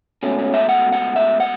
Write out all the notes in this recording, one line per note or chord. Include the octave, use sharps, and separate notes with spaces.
C#2 B2 A3 C#4
C#4
E5
F#5
F#5
E5
F#5